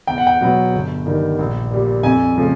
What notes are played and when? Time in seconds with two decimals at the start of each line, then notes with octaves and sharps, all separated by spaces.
0.07 E2 G5
0.18 F#5
0.27 G5
0.41 B2 F#3 B3
0.73 G1
1.05 G2 D#3
1.39 A#1
1.71 A#2 G3
2.03 F2 G#5
2.36 C#3 F3 A3